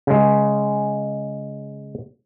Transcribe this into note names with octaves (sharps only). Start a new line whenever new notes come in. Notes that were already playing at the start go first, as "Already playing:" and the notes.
C#3 G#3